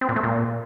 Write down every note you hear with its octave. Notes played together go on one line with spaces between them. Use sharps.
C4
A#2
A3
A#2